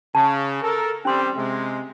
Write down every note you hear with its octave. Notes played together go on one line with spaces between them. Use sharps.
C#3 A5
A4 A#4
G3 C4 C#4 C6
C3 G#3